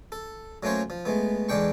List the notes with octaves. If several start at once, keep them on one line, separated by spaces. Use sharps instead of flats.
A4
F#3 A3 A#3 C#4 C5 C#5
F3
G#3 A3 B3
E2 D3 G#3 D4 G5 C#6